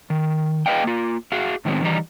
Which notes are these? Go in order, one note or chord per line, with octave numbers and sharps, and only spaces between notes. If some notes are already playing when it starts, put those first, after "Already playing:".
D#3
G#4 B4 D#5 F5 G5
A#3 F4
F#4 G#4 F5
A2 D#3 F#3 G#3 B3 C4
D#3 E3 G3 D#4